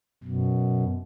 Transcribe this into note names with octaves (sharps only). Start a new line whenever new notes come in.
F#2 B2